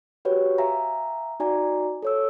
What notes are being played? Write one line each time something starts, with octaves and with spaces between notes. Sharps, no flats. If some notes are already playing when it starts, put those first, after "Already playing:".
F#4 G4 B4 C#5
E5 F5 G#5 A#5
D#4 F#4 D5 G#5 A#5
A4 C#5 E6